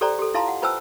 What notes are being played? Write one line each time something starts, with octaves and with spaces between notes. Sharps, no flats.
G4 A4 C5 D5 G5 A#5
G4 A4
E4 F4 F5 A5 A#5 C6
F#5
F4 B4 C5 G5 A5 E6